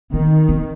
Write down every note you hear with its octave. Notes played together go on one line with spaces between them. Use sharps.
D#3 C4
C4